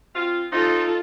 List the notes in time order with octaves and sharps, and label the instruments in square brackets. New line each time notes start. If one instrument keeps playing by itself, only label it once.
[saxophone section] C4 F4
[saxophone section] F3 C4 D#4 [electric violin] F4 A4